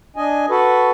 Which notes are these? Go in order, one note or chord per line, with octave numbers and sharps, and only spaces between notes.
D4 D#5 G#5
F#4 A4 B4